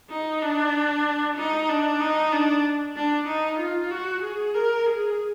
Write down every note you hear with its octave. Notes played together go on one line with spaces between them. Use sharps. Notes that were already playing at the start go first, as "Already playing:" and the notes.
D#4
D4
D#4
D4
D#4
D4
D4
D#4
F4
F#4
G#4
A#4
G#4